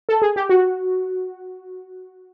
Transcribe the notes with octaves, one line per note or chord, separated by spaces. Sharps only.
A4
G#4
G4
F#4